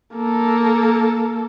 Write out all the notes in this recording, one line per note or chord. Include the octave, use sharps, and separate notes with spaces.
A#3 A4